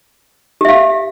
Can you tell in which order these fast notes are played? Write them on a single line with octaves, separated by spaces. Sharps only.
G4 E5 F5